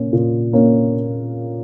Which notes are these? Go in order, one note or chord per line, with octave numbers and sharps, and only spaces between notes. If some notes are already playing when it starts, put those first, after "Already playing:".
Already playing: A#2 A#3 C#4
A#2
A#3 C#4